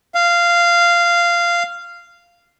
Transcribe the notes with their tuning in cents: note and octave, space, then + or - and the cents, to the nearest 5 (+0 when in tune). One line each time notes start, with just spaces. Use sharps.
F5 -15